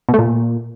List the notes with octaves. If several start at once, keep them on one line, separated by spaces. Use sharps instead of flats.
B2
A3
A#2